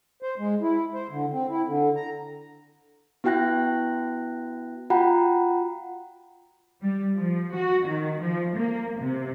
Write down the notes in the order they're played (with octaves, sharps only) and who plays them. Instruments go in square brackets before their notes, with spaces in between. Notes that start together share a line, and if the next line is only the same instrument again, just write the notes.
[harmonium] C5
G#3
E4
C5
D3
C4
E4
D3
A#5
[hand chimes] B3 E4 F#4 G5 F#6 A#6
F4 F#4 F#5 G5 A#5 B5
[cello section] G3
F3
F#4
D#3
F3
A#3
C3